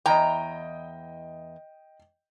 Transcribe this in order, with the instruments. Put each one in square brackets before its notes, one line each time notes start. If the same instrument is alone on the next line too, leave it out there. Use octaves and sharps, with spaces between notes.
[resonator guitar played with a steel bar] E2 A#5 [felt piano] D#5 G5